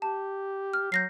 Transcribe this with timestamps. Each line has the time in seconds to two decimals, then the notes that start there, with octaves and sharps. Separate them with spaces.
0.02 G4 A5
0.74 F6
0.92 F#3 G6 A#6 C7